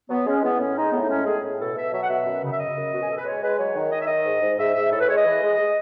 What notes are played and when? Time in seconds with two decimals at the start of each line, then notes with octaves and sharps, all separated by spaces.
0.09 F#3 B3
0.26 G#3 C#4
0.43 E3 B3
0.59 A2 C#4
0.76 G#3 D#4
0.92 A2 B3
1.02 D#4
1.09 G#3 C#4
1.26 A2 G#4
1.43 A2
1.59 B2 A4
1.76 B2 E5
1.92 F#3 E5
2.03 F#5
2.08 B2 E5
2.26 F#2
2.42 C#3
2.51 E5
2.58 C#3 D#5
2.76 F#2
2.92 B2 F#4
3.01 G#4
3.08 B2 A4
3.18 B4
3.25 G#3 C#5
3.42 G#3 B4
3.58 F#3 C#5
3.75 D#3
3.91 D#3 D#5
3.99 E5
4.07 D#3 D#5
4.25 G#2
4.41 G#2
4.58 G#2 E5
4.75 G#2 E5
4.91 A2 A4
5.00 B4
5.08 G#3 C#5
5.16 D#5
5.25 E3
5.41 G#3
5.58 G#3